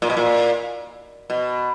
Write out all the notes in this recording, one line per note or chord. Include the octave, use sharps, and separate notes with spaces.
A#2
B2
A#2
B2